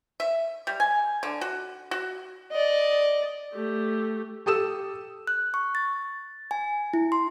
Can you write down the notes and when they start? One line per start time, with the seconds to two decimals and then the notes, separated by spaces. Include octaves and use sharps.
0.20 E5
0.67 G3
0.80 G#5
1.23 D3
1.41 F#4
1.91 F#4
2.52 D5 D#5
3.54 A3 G4
4.46 G4 A4 D#6 E6 E7
5.27 F#6
5.54 C#6
5.75 A6
6.51 G#5
6.93 E4
7.12 C6